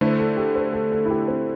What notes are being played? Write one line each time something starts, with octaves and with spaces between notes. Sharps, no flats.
D3 A3 E4 C5
A4
G4
C5
A4
A4
E4
G4
C4